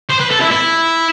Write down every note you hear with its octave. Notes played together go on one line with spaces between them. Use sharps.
C5
B4
A4
E4
E4